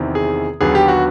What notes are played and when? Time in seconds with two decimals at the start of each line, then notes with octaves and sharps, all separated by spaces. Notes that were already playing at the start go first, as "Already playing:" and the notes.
Already playing: E2 C3 D#3
0.15 G#4
0.61 D#2 D3 F#3 B3 G#4
0.75 G4
0.88 F#4